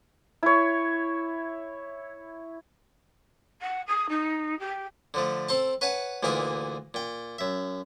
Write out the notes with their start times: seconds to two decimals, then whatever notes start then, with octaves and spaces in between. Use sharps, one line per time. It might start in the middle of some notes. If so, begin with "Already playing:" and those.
0.43 E4 C#5
3.61 F#5
3.87 D#6
4.09 D#4
4.59 G4
5.14 D3 F3 A3
5.49 C4 A4 C5 A5
5.81 B4 C#5 F#5 G#5 A5
6.23 D2 A#2 E3 A#3 D#4 D5
6.94 A#2 G5
7.38 F#2 E5